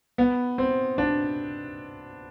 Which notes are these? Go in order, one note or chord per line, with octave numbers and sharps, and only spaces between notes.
B3
C4
D4